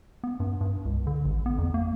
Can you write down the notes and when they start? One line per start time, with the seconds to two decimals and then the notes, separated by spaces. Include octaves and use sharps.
0.24 B3
0.40 G2
0.61 G2
0.85 C#2
1.07 D3
1.25 A1
1.46 B3
1.58 F2
1.74 A#3